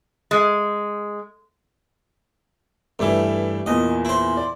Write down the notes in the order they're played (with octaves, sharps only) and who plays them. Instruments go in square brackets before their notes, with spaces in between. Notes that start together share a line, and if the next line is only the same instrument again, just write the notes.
[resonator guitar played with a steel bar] G#3
[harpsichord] G2 E3 [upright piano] A3 E4
[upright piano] E2 A#2 [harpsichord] D#5
[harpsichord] E4 C5
[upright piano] D5